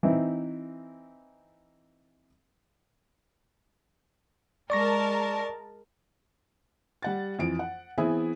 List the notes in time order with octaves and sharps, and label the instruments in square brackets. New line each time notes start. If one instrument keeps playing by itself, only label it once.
[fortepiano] E3 C4 D#4 E4
[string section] G#3 A#4 A5 [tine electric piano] D5 C#6 A#6
[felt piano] G3 F#5 A6
F2 E3 D7
F#5
E3 B3 C4 E4 G#4 E5